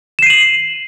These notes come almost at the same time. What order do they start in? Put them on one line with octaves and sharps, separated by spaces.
E7 C7 D#7 F#7